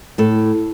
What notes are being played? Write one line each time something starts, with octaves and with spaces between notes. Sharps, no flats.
A2 A4